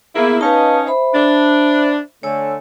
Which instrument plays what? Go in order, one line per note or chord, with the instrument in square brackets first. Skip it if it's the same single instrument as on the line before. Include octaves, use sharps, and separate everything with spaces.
[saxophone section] A#3 E4 [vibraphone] B3 G#4
[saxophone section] C#4 D#4 [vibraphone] B4 F5 A5
[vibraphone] C5 E5 B5
[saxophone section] D4
[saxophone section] D3 A3 [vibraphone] C#5 G#5 E6